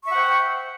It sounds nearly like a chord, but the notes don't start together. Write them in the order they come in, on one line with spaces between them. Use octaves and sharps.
C#6 E5 F#5 C5 G5